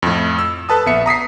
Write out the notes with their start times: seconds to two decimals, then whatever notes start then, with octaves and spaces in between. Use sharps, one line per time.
0.02 F2 A2
0.38 E6
0.69 A4 B4 A5 D#6
0.86 A#1 B3 E5 C#7
1.06 A#5 D#6 B6 C7